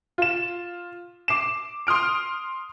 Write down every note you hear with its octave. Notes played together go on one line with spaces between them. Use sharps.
F4 E7
D6 C7 E7
C6 D#6 F6 D7